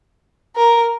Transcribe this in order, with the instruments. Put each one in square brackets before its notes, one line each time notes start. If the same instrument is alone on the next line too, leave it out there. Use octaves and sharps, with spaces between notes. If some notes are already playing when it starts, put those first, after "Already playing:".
[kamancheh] A#4